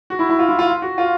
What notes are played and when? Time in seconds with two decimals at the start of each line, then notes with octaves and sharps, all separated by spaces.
0.10 F#4
0.19 E4
0.29 E4
0.39 F4
0.49 E4
0.59 F4
0.82 F#4
0.98 F4